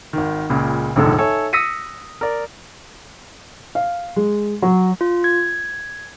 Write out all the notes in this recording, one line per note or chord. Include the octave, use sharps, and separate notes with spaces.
G#1 D#3
C#2 A#2 C#3
F1 A#1 D#2 G#2 D3 A4
D#4 A4 C#5 E5 G#5
D#6 E6 A#6 B6 C#7 D#7
A#4 D5
F5
G#3
F#3
F4
G#6